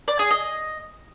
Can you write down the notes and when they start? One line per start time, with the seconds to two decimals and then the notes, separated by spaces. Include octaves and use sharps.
0.08 D5
0.19 G#4
0.31 D#5